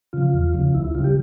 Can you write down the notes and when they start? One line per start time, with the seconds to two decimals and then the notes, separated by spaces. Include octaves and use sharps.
0.13 C#3 F3 F4
0.34 E2
0.54 C#3 F3
0.74 D2 E4
0.84 E4
0.95 C#3 G3 F4
1.04 G4